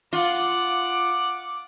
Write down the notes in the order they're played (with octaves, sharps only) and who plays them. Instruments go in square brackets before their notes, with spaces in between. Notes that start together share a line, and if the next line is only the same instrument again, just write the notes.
[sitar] F4 [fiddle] F#5 [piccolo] D6